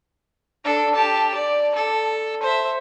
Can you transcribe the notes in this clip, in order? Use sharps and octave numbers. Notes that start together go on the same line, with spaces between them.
D4 A4
G4 A5
D5
A4
C5 E5